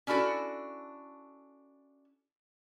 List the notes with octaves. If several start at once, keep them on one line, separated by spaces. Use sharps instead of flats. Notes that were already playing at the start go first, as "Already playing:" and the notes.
C#4 D4 E4 F#4 A4